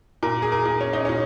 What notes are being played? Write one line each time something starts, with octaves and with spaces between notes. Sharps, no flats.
A#2 A#4
G#4
A#4
A#2
C#4
D#4
A#2 C#4